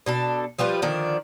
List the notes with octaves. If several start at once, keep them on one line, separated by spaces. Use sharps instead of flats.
B2 D4 A4
F3 G3 F4 B4
D3 D#3 F3 D4